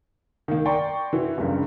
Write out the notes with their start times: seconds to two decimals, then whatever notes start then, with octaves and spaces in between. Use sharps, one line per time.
0.48 D#3 A#3
0.66 D5 G5 A#5 C6 C#6
1.13 E3 E4 F#4 B4
1.38 F#1 C#2 G2 C#3